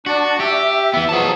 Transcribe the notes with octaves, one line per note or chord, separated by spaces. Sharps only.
D4 F#4 D5
G4 E5
E3 B3
B2 F3 F#3 G#4 A5